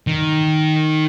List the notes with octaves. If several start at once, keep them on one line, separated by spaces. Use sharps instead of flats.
D#3